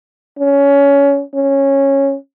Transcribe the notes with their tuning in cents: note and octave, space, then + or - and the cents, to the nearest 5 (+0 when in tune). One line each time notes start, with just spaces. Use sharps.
C#4 +20
C#4 -10